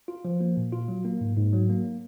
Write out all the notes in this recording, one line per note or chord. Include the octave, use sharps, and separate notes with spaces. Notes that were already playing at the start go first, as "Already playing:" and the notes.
F4
F3
A#3
A#2
F4
F#3
A#3
G#2
G#2
F#3
A#3